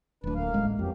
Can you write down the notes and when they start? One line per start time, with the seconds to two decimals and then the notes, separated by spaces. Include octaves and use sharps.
0.24 D1 D2 D4 B4
0.35 A2 A#3 F5
0.54 A1 G#3
0.79 F2 E3 F#3 G4